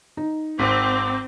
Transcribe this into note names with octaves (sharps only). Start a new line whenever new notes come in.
D#4
G#1 C4 D6